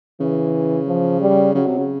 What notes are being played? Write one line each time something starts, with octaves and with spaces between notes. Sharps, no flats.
C#3 E3
F3
G3
C#3 F#3
C3
C#3